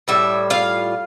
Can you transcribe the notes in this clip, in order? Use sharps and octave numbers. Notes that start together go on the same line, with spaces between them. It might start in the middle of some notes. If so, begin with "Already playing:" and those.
A2 G3 E5
F4 F5